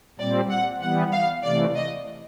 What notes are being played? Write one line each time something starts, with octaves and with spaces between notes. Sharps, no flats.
A#2 G3 C4 D5
F#5
E3 G3 B3 F#5
F5
C3 E3 A3 D5
D#5